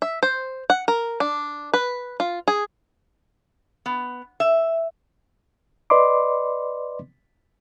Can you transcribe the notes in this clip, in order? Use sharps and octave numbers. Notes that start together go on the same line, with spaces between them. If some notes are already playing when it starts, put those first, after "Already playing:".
E5
C5
F#5
A#4
D4
B4
F4
G#4
B3
E5
B4 D5 D#5 B5 C6 D6